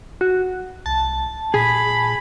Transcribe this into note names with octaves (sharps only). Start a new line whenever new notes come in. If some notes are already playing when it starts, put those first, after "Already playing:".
F#4
C2 A5
A#2 G#4 B5